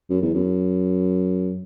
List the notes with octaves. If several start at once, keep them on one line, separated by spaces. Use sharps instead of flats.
F#2
E2
F#2